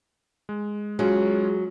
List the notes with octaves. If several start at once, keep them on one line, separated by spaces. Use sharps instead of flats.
G#3
F#3 G#3 C#4 F4 G#4